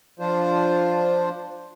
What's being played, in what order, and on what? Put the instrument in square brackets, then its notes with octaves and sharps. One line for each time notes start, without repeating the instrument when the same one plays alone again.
[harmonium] F3 D4 F4 C5